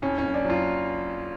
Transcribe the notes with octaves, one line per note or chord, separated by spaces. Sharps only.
F2 C#4
C#4
F#1
D4
F#3 F4